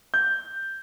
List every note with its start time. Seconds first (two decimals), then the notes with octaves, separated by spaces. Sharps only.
0.14 G6